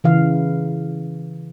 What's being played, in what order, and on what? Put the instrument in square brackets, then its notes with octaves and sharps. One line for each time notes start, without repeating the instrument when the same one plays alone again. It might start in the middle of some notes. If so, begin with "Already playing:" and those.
[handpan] C#3 E3 F5